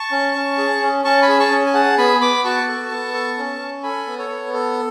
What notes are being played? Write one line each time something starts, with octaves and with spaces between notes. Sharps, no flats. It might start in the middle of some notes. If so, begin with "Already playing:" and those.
Already playing: A5 C#6
C#4
C#4
G#4
C#4
C#4 A5 C#6
G#5 B5
G#4
A5 C#6
C#4
G#5
G#4 F#5 A5
B3 G#5 B5
B3 B5 D6
F#4 A5 C#6
A4
B3
A4
C#4
C#4
A4 G#5 B5
B3
A4 C#5
B3
A4